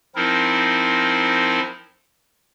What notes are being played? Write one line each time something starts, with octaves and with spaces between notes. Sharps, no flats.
F3 C4 D#4 E4 A#4